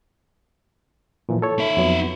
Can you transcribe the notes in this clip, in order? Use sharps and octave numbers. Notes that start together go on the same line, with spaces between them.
A#2 E3 F3
A4 C#5
D#4 E5
F2 F#3 B3